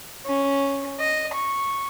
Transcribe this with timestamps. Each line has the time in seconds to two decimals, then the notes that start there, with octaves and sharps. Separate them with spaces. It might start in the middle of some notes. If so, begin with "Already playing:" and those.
0.25 C#4
0.99 D#5
1.34 C#6